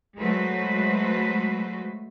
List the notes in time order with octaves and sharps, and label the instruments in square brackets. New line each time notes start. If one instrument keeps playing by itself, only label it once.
[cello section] F#3 G#3 A3 F#4 B4 C5